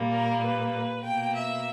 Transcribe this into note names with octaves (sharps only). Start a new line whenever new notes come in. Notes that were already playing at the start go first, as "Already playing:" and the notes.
Already playing: A#2 G3 A#3
A#4
B4
B2 A#3 G5
E5